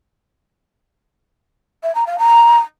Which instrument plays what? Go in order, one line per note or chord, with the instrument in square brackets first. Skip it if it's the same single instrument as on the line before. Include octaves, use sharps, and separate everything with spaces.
[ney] E5
A#5
F5
A#5